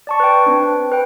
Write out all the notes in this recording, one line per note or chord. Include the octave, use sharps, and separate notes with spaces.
D5 A5 C#6
B4 G5
C4 D4 B4
B4 G5